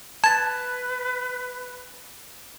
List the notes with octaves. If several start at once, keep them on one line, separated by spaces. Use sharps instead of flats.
B4 A5 G#6 A6